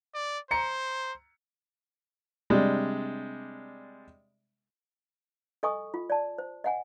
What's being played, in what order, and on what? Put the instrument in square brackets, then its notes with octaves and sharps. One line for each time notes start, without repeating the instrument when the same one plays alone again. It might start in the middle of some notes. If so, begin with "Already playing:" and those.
[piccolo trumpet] D5
[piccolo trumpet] C5 [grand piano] A#5 C#7
[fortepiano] C3 G3 G#3 D4
[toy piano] A4 D#5 G#5 C#6 D#6
F4
D5 A5
C5
D#5 F#5 G#5